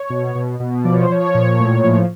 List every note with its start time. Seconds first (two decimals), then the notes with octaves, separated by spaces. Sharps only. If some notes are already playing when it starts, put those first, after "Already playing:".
Already playing: C#5
0.10 B2
0.35 B2
0.60 B2
0.85 F3 D5
0.93 C#5
1.03 C5
1.10 F3 C#5
1.34 A#2
1.60 A2
1.84 F3